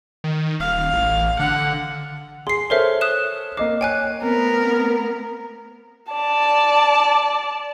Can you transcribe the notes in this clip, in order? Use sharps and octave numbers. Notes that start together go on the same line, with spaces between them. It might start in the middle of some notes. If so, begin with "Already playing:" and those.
D#3
D#1 F5
A1
D3 F#5
G#4 C6 C7
A4 A#4 C5 C#5 E5 F6
D#6 F#6 E7
A#3 D#5 D6 C7
C#5 G5 G#5 F#6
A3 B3 C4 A#4
D5 A5